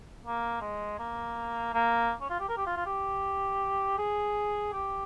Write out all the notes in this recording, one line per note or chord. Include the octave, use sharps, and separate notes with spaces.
A#3
G#3
A#3
A#3
C#4
F4
G4
A#4
G4
F4
F4
G4
G#4
G4